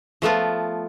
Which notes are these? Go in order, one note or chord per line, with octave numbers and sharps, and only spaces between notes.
F3 A3 B3 F4